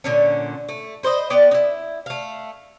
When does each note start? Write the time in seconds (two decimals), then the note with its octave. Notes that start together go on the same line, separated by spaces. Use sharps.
0.04 A#2 D3 C#4
0.69 A3
1.03 B4 C5 D5 D#5
1.30 B3 D5 G5
1.51 D#4 E4
2.06 A3 F5